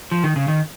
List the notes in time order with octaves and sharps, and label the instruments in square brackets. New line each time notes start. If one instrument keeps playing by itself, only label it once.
[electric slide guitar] F3
D#3
C#3
D#3